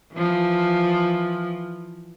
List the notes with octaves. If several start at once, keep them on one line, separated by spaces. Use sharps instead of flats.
E3 F3